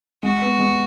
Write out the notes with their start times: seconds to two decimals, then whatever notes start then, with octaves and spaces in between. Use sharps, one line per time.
0.23 G#3 F#4
0.42 B3
0.59 G#3